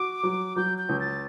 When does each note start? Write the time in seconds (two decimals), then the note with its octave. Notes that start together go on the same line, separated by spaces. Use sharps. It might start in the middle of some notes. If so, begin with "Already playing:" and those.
Already playing: F#4 D6
0.23 F#3
0.56 F#3 G6
0.78 G6
0.89 C#2
1.00 A6